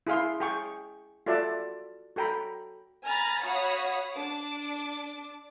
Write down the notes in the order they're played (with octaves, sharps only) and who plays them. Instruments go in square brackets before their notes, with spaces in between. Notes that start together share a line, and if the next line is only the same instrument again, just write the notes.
[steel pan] E4 G#4 F5 C6
G#4 G5 C#6
F4 F#4 A4 D5 E5 A5
F#4 A4 G5 A#5 B5
[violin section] G#5 A#5 B5 F6 A6
F#4 C#5 F5 F#5 B5 D#6
D4 D6